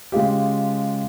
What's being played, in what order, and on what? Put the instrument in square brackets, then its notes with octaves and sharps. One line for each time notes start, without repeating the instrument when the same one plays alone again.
[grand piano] C#3 G#3 F4 G4